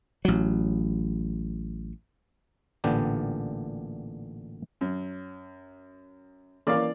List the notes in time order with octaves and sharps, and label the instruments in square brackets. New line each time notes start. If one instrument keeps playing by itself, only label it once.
[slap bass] A1 F#3
[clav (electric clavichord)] A1 A#2 D3 B3 D4 G4
[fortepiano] F#2
[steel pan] E3 C#4 [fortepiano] A#3 F5 [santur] D5